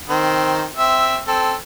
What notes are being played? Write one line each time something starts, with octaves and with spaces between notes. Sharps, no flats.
D#3 C4 C5
C4 E5
C4 A4